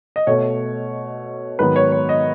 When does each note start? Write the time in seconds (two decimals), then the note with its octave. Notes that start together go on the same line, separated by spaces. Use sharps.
0.16 D#5
0.27 B2 A3 C#5
1.59 G#2 D#3 F#3 B3 B4
1.76 C#5
1.92 C#5
2.09 D#5